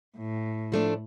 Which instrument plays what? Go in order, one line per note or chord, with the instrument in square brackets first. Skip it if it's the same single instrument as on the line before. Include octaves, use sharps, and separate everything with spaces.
[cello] A2
[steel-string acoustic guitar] F3 A3 D4